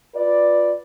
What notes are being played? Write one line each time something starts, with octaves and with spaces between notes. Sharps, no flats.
F4 B4 D5